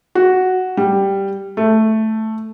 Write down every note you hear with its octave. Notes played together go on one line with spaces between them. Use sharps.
F#4
G3
A3